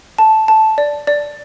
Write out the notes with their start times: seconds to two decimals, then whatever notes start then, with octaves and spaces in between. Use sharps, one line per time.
0.18 A5
0.48 A5
0.78 D5
1.07 D5